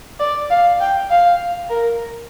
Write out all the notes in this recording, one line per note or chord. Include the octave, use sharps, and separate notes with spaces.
D5
F5
G5
F5
A#4